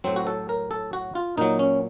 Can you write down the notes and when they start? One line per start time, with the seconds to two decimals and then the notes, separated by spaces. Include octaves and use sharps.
0.04 A2 F#3 C4
0.16 F#4
0.27 A4
0.49 A#4
0.71 A4
0.93 F#4
1.15 F4
1.37 A#2 F#3 D#4
1.59 C#4